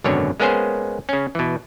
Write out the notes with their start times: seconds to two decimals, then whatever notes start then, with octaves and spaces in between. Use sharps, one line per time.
0.04 G#1 F#2 B2 D3 C#5
0.40 G#3 A#3 B3 C#4 G#4 C5
1.09 C#3 C#4
1.35 B2 E3